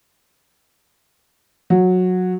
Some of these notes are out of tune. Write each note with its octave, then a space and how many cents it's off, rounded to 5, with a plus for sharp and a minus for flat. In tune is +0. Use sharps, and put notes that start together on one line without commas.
F#3 -15